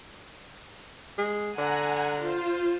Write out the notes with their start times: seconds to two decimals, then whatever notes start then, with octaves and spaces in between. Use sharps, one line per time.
1.18 G#3
1.58 D3 F#5 G#5 A#5
2.21 F4 C5